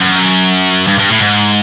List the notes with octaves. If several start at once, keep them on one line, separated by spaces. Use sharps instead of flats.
F#2
G2
G2
A2
G#2